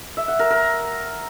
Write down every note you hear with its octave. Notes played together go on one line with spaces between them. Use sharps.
E5
F#5
A#4
A#4